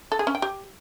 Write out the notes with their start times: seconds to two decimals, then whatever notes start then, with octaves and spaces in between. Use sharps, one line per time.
0.12 A4
0.19 G#4
0.27 C#4
0.35 G5
0.42 G4